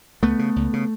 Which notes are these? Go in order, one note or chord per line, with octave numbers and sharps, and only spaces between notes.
C#2 A3 B3
C#3
C#2
C#3